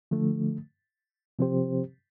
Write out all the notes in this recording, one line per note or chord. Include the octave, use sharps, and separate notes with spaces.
D3 F3 A3
C3 F3 C4 G4 C5